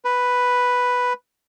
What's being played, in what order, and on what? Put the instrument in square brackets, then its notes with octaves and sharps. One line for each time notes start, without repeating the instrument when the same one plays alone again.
[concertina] B4